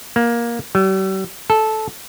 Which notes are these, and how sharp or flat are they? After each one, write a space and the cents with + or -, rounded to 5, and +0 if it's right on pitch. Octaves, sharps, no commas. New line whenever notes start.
A#3 +15
G3 -45
A4 -10